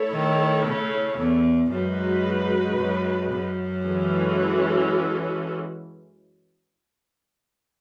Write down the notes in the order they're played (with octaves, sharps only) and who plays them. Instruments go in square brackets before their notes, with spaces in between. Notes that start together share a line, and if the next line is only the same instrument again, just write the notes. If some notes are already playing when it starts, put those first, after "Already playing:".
Already playing: [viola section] A3 E4 A4 C#5
[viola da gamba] D#3
C#3
E2
[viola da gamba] F#2 [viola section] G#3 D#4 F#4 B4
[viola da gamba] F#2
F#2
[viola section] E3 G#3 C#4 F#4 A4